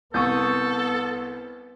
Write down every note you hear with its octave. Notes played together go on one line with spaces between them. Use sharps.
C2 B3 A4 C#6 D#6 G6